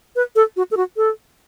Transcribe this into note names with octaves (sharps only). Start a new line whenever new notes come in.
B4
A4
F#4
A4
F#4
A4